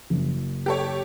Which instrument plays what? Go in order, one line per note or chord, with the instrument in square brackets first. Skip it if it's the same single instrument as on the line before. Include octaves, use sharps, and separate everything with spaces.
[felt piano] F#1
[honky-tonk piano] G4 A4 C#5